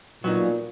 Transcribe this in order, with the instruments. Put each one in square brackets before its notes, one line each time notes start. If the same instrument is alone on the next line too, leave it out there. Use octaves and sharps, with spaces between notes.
[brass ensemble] A#2 [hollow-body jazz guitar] F#3 B3 D#4